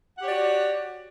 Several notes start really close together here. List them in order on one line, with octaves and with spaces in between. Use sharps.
F#5 G4 C#5 D5 F#4